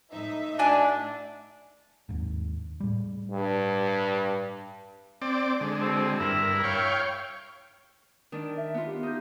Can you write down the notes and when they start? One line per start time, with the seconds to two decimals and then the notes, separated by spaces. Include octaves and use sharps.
0.12 A2 D#4 E5
0.59 D4 F#4 G#5
2.09 D#2 G#2
2.80 A2 G3
3.32 G2
5.22 C4 D5
5.61 D3 G#3
5.81 B2 C4
6.20 G2 E4 A#4
6.64 C#5 F5 G5
8.32 D#3 D4 A#4
8.58 E5
8.74 B3 F4
8.87 G4
9.03 D#4 G6